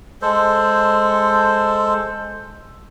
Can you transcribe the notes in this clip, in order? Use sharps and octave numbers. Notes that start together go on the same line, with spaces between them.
G#3 A4 C5